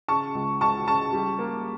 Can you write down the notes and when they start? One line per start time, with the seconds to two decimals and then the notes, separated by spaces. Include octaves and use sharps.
0.08 C#3 A5 C#6
0.35 C#2
0.61 C#2 A5 C#6
0.87 C#3 A5 C#6
1.13 G3
1.39 A#3